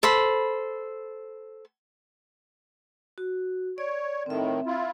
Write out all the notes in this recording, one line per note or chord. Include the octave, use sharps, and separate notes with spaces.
A4 C5 B5
F#4
C#5 D5
A2 D#3 C4 E5
E4 F4